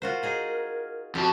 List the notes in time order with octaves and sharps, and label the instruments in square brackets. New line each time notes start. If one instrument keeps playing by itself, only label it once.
[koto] F4 F#4 C5 [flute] A#4
[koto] D#4 G#4 C5
[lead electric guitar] F2 A5 [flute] F#4 [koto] G4